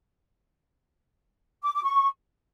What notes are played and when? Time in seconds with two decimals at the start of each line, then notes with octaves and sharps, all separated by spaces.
1.63 D6
1.74 D6
1.84 C#6